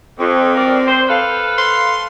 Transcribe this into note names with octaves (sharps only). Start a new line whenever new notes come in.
F2 C4
F#4 A#4 D5
C5
A4 B4 F5
C6